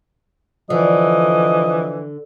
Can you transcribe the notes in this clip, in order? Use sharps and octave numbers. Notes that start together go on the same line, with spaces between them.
D3 E3 F3 D#5